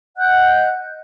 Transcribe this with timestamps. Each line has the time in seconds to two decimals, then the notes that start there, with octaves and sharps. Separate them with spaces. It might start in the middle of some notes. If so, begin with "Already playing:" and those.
0.18 D#5 F#5 F#6 G6